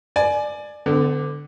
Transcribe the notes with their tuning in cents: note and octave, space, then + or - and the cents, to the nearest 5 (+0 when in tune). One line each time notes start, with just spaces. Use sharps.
D5 +20 G#5 +25
D3 +0 B3 +45